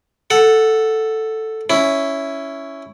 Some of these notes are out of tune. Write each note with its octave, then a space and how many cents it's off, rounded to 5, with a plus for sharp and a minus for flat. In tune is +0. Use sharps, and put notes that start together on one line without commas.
A4 +0 F#5 +0
C#4 +5 E4 +0